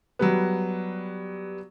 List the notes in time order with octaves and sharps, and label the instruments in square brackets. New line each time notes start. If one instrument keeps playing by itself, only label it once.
[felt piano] F#3 G3 B3